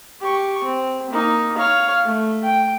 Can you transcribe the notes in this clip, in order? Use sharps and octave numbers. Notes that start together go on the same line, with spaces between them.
G4 C#6
C4
A#3 D#4
C#5 F5
A3
G5